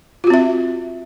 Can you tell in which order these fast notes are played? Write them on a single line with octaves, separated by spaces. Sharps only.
F4 F#4 C4 E5